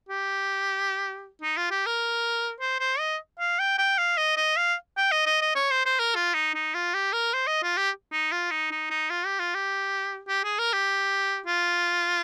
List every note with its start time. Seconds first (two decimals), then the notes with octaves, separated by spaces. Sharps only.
0.09 G4
1.42 D#4
1.57 F4
1.71 G4
1.86 A#4
2.60 C5
2.80 C5
2.99 D#5
3.39 F5
3.59 G5
3.78 G5
3.98 F5
4.17 D#5
4.37 D#5
4.57 F5
4.97 G5
5.11 D#5
5.26 D#5
5.42 D#5
5.55 C#5
5.71 C5
5.86 C5
5.99 A#4
6.15 F4
6.34 D#4
6.55 D#4
6.74 F4
6.94 G4
7.13 A#4
7.34 C5
7.47 D#5
7.63 F4
7.77 G4
8.12 D#4
8.32 F4
8.51 D#4
8.71 D#4
8.90 D#4
9.10 F4
9.26 G4
9.39 F4
9.55 G4
10.28 G4
10.44 G#4
10.59 A#4
10.73 G4
11.46 F4